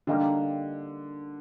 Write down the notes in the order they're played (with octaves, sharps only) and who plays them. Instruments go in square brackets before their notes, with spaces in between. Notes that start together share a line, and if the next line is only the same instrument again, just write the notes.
[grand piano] D3 [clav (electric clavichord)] G3 A#3 D#4 G4